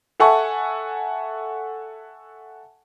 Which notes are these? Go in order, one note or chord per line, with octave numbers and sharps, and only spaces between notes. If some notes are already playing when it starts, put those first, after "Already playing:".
A4 E5 F#5 G#5 A5 C#6